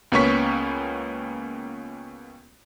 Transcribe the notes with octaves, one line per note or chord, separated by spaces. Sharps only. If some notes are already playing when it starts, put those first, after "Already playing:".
C#2 A#3 B3 C#4 C#6 B6